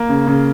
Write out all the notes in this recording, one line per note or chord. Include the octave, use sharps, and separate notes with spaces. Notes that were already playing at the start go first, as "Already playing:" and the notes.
Already playing: A#3
C#3
C#3